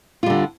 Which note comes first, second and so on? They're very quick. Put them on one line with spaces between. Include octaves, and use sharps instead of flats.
F4 G3 D3